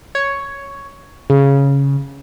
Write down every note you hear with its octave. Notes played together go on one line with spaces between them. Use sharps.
C#5
C#3